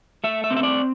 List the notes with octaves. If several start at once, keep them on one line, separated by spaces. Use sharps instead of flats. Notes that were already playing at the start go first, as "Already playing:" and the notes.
A3 E5
E5
C4
E5
D5